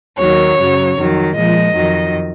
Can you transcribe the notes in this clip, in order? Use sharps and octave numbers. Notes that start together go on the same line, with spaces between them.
D#2 D#3 F#3 C#5
F#2 C#3 F#3
F2 D#3 F#3
A#2 F3 G#3 D#5
F2 D#3 F#3